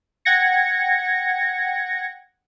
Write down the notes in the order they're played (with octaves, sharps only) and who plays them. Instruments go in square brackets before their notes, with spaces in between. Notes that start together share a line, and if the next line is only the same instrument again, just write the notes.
[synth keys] F#5 G5 G#6 A#6 C#7